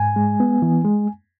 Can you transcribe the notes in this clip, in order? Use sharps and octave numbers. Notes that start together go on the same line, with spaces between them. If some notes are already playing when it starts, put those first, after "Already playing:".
Already playing: G#2 G#5
G#3
B3
E3
G#3